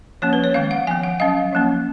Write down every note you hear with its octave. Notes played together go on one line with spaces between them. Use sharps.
F3 A#3 C#4 C#5
B4
C#5
D#3 G#3 B3 F5
F#5
F3 B3 G#5
F#5
F#3 C#4 F5
F3 A#3 C#4